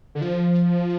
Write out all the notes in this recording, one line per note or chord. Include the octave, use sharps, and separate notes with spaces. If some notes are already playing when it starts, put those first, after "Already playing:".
D3
F3